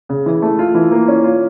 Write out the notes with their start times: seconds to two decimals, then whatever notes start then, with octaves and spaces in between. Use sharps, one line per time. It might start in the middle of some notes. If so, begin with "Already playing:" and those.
0.09 C#3
0.26 E3
0.42 A3
0.59 F4
0.75 E3
0.91 A#3
1.08 C#4
1.24 F4